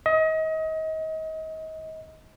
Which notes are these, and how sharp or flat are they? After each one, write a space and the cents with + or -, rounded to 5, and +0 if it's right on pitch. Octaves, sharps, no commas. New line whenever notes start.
D#5 +30